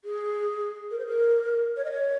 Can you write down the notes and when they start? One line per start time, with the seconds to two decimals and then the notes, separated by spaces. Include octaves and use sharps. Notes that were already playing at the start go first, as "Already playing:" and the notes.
0.05 G#4
0.91 A#4
0.99 C5
1.06 A#4
1.77 C#5
1.85 D#5
1.92 C#5